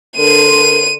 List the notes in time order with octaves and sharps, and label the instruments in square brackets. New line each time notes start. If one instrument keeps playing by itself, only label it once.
[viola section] D3 A#4 C6 [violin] D#7